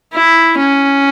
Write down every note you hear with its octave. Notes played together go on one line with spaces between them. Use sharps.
E4
C#4